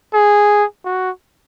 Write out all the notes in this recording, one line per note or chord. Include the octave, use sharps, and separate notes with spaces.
G#4
F#4